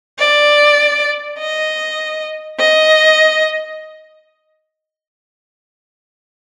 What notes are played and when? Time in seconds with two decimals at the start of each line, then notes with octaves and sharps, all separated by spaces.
0.19 D5
1.39 D#5
2.59 D#5